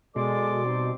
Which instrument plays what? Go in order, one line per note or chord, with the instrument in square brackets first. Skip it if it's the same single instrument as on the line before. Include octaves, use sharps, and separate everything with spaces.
[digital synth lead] B2 [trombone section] G#3 A4 [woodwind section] D5 C6 D6
[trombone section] G3 C4 D#4